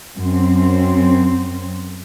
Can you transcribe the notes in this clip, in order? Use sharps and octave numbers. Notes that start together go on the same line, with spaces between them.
F#2 C4